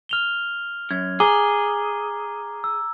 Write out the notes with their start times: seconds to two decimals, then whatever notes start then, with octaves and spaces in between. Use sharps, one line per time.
0.09 F6 F7 G7
0.91 F#2 G#6
1.20 G#4 A#5 D6 G7
2.64 E6